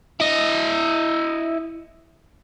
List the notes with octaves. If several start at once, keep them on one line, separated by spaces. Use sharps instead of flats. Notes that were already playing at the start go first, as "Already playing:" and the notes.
E4 D#5